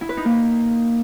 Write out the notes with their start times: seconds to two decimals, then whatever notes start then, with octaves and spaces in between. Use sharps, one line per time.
0.01 E4
0.09 B4
0.17 D#4
0.25 A#3